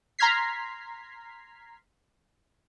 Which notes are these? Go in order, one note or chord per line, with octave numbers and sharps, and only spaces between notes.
A#5 C6 F6 G#6 B6 C7